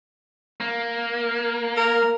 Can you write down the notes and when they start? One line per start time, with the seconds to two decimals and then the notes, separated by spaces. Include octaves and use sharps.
0.60 A#3
1.77 A#4